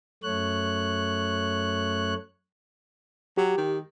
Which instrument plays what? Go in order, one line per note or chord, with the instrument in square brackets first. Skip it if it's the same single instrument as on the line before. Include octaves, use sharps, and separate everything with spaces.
[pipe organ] F#2 A3 C#5 F#6
[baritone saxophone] F#3 [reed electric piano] G4
[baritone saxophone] D#3